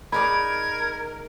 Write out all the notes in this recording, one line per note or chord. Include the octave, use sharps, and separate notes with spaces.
D#4 G#4 A#4 D5 B5 G#6